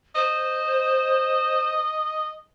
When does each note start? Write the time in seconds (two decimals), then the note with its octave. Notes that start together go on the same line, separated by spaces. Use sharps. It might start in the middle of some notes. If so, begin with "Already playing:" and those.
0.15 C5 D#5